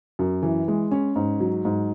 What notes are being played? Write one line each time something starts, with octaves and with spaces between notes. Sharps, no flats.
F#2
E3
G#3
C#4
G#2
F#3
G#2